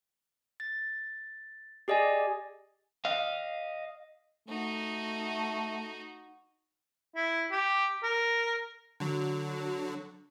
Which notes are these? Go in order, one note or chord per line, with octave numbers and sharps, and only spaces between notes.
A6
G4 G#4 D5 D#5 G#5
D#5 F5
A3 D#4 F#4
E4
G4
A#4
D3 F#3